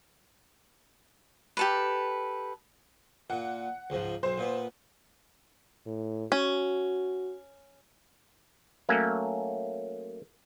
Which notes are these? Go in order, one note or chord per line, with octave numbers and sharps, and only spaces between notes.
G4 A4 B4
A#2 F#5
C#2 G#2 F3
B1 C5
A#2 B3
A2
C#4 F#4
F#3 A3 A#3 C#4